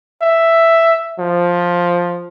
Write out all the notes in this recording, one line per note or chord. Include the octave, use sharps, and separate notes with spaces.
E5
F3